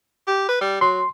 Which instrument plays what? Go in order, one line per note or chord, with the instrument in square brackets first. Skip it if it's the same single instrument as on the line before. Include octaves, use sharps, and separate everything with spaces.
[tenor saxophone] G4
B4
G3
[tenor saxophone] F#3 [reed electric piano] C6